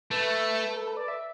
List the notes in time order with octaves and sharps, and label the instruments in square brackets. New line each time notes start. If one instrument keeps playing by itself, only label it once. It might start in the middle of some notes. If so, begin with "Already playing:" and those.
[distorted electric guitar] A3 [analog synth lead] B4
[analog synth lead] A4
B4
D5
E5